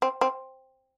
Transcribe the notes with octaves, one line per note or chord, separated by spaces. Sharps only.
C4
C4